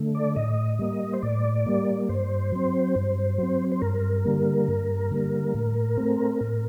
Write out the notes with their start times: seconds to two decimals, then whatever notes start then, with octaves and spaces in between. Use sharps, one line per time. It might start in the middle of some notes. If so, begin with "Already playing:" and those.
Already playing: D3 A3
0.15 D5
0.36 A2 D#5
0.79 G3 A#3
1.13 C5
1.22 A2 D5
1.66 G3 A#3
2.09 G2 C5
2.52 F#3 C4
2.96 G2
3.38 F#3 C4
3.72 C5
3.82 G2 A#4
4.25 D3 G3 A#3
4.68 G2
5.11 D3 G3 A#3
5.54 A2
5.98 A3 C4
6.41 A2